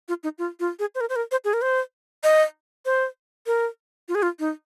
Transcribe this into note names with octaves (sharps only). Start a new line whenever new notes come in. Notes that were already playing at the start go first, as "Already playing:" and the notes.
F4
D#4
F4
F4
G#4
C5
A#4
C5
A#4
C5
G#4
A#4
C5
D#5
C5
A#4
F4
G#4
F4
D#4